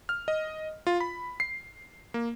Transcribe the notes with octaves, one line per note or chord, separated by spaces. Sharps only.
F6
D#5
F4
B5
C7
A#3